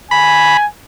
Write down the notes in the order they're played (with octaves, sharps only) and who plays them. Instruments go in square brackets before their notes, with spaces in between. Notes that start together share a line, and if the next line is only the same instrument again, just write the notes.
[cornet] G#5 [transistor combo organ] B5